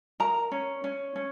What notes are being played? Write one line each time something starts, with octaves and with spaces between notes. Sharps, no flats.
A#4 A#5
C#4
C#4
C#4